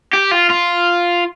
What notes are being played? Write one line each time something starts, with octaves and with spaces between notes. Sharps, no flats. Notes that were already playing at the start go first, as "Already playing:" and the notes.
G4
F4
F4